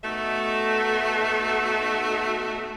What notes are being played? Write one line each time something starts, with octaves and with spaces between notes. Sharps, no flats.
B2 A3 D#4 F#4 A4 E5